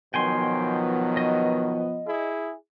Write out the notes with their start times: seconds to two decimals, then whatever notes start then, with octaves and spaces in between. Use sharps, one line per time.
0.14 B2 D#3 F3 F#3 B3 G5 G#5 C6
1.17 D#5
2.07 E4 G#4